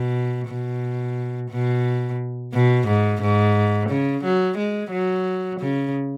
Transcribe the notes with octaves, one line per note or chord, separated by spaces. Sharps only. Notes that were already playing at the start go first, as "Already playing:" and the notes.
Already playing: B2
B2
B2
B2
G#2
G#2
C#3
F#3
G#3
F#3
C#3